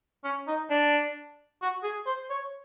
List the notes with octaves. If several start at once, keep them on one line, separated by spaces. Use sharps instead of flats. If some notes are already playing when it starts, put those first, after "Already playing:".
C#4
D#4
D4
F#4
G#4
C5
C#5